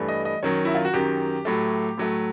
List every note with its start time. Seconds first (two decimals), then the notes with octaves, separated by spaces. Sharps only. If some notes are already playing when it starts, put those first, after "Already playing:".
Already playing: G2 E3 A3
0.09 D#5
0.25 D#5
0.43 F#2 D#3 F#3 C#5
0.65 E4
0.75 F4
0.85 F#4
0.94 F#2 D#3 F#3 G4
1.45 A2 F#3 A3
1.98 A2 F#3 A3